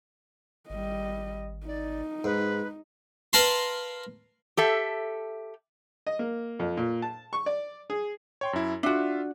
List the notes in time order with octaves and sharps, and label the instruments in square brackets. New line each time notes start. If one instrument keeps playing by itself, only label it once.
[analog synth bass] G#1 [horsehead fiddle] G3 D#5
[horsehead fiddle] D#4 [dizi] D5
[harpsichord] G#2 [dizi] B4
[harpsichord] A#4 B4 F5 A5 A#5 C6
[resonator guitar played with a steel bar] G4 A4 E5
[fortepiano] D#5
A#3
F2
A#2
A5
C#6
D5
G#4
[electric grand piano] C#5 G5 C6
F#2 E4
[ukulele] D4 F#4 [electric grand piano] F4 E5